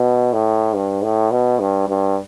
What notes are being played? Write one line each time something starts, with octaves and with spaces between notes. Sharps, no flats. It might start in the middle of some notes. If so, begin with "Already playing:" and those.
Already playing: B2
A2
G2
A2
B2
G2
G2